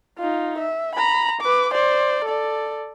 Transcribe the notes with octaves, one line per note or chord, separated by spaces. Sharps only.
D#4 F4
E5
A#5 B5
B4 D6
C5 D5
A4 D5